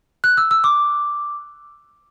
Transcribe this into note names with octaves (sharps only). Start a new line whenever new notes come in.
F#6
E6
E6
D6